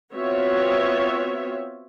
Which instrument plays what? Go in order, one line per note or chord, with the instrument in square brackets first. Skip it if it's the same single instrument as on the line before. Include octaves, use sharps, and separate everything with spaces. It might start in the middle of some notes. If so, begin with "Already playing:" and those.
[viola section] B3 C4 F4 F#4 C#5 E5